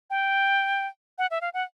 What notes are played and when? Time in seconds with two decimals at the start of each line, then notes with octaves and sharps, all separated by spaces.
0.10 G5
1.18 F#5
1.31 E5
1.41 F5
1.54 F#5